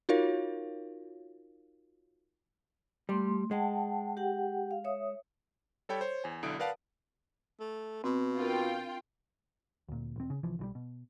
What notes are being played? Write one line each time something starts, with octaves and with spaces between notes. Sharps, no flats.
D#4 F4 F#4 A#4 C#5 F5
G3 A3 C6
G#3 F#5 G5 A5
G4 F#5 G5
F5
C#5 E5 D#6
G3 A4 C#5 G5 B5
C5 C#5
E2 G#5
B1 D3 E4 D#6 D7
A#4 B4 D5 F5 F#5 A5
A3
B2 C4
D4 F4 A#4 G5
D2 A#2
E1 C4
C#3
C2 E3 F3
B1 E3 G3
B2